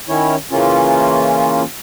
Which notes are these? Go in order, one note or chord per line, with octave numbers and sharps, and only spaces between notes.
D#3 C#4 E4 C#5
C#3 E3 A#3 C#4 F4